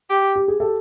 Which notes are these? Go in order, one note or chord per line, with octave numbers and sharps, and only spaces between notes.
G4
G4
G#4
G4 A4